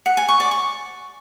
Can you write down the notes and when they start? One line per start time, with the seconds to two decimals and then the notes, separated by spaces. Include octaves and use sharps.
0.06 F#5
0.17 G#5
0.29 C#6
0.40 D5
0.51 C#6